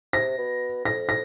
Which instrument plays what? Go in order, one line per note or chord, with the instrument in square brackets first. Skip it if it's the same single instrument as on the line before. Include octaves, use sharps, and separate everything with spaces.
[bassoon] C3 [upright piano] A#6
[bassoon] B2
[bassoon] F2 [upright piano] A#6
[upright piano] A#6